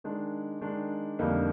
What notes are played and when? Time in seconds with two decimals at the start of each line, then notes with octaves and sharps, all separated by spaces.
0.04 D#3 G#3 D4
0.61 D#3 G#3 D4
1.19 F2 D3 G3 A#3 D#4